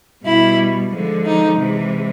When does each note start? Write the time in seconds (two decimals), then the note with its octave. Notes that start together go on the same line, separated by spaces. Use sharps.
0.24 B2 G3 E4
0.92 D3 F3 G#3
1.26 D#4
1.59 C3 E3 G#3